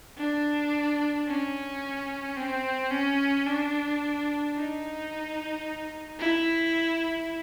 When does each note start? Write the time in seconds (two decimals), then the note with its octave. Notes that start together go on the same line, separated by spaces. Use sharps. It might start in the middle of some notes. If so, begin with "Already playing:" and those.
0.18 D4
1.27 C#4
2.37 C4
2.91 C#4
3.46 D4
4.56 D#4
6.19 E4